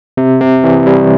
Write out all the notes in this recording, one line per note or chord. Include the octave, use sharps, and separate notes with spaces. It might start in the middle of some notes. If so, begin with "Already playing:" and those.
C3
C3
E3
G3